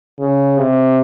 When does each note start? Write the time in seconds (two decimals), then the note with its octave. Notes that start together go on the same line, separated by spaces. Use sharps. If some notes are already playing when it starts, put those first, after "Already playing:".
0.20 C#3
0.59 C3